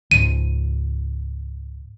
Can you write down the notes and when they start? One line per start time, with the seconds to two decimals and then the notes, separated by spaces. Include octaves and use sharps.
0.11 C#2 G#2 D#7